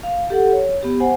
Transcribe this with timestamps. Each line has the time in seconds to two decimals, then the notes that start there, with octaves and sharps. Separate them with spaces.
0.03 F5
0.30 G4 A4 F#5
0.52 C#5
0.83 B3 G4
1.00 C5 F#5 G#5